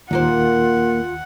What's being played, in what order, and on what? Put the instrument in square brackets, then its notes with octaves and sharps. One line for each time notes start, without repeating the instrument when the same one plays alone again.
[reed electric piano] D#2 [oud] A#2 A#3 C5 [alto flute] F4 [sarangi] F#5